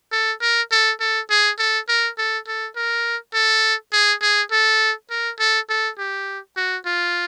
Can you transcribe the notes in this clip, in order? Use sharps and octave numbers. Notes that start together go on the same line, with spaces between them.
A4
A#4
A4
A4
G#4
A4
A#4
A4
A4
A#4
A4
G#4
G#4
A4
A#4
A4
A4
G4
F#4
F4